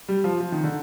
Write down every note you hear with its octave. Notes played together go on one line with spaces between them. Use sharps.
G3
F3
F3
D#3
D3